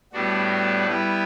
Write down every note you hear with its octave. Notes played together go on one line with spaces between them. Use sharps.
A2 G3 B3 D4 F#4
G3 B3 E4 B4